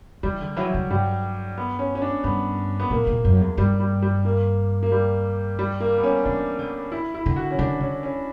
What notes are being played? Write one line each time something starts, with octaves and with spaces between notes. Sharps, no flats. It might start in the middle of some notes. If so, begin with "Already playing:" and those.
E3 G3
D3
E3 F#3
D3
G2 G3
B3
C#4
C#4
D4
G2 B3
B3
A#2 A#3
A#2
F#2
E2
G2 G3
G3
G3
A#3
A#3
G3
G3
A#3
B3
C#4
E3 D4
D3
E4
E4
D3
F#4
C#4
D3 D4
D3 C#4
C#4